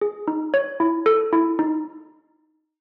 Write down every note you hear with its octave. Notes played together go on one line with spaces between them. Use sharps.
G#4
D#4
C#5
E4
A4
E4
D#4